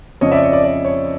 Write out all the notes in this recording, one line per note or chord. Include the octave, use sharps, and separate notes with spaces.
F2 C#3 F3 C#5 D#5
D5 E5
C#5 D#5
D5
D5
C#5